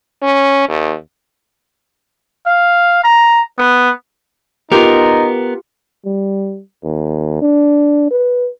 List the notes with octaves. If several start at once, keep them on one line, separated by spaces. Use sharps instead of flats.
C#4
D#2
F5
A#5
B3
B3 D#4 F4 G4 A#4
G3
D#2
D4
B4